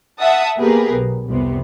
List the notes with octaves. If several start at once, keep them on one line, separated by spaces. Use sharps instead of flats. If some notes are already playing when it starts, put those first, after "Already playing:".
E5 F#5 A5 D#6
A#3 B3 G4 G#4 A#4 B4
B1
C2 F2 C3 B3